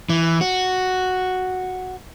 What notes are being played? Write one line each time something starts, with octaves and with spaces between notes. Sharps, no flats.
E3
F#4